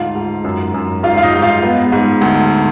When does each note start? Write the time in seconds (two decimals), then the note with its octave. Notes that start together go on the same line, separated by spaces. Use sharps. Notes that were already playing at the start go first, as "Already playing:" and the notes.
Already playing: D2 G#2 F4 F5
0.15 G#2
0.44 F#2
0.74 F#2
1.03 G#2 F4 F5
1.17 F5
1.23 D#4 D#5
1.33 G#2
1.42 F4 F5
1.63 B3
1.92 G#2
2.21 D2